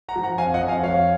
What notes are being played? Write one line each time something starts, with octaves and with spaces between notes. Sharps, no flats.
F#5 A#5
F3
F#5 A#5
F2 F5 G#5
D#5 F#5
F2
F5 G#5
F3 C#5 F5